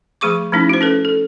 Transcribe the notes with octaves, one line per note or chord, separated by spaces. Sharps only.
F3 A3 G#4 C#6 D6
F3 A3 C#4 D#4 E4
F#4 C5
C#4 A4 B4
A4